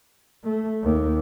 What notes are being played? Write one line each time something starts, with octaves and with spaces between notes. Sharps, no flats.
A3
D#2